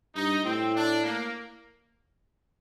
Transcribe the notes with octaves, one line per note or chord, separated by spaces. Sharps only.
G2 D#4
A2 C4
D4
A#3